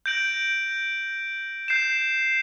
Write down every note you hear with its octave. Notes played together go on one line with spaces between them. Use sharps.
G6 A#6 D7 F#7
G6 C7 E7